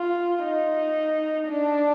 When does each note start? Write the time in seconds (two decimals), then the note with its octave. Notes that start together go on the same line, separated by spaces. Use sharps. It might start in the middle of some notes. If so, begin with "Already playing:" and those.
Already playing: F4
0.44 D#4
1.49 D4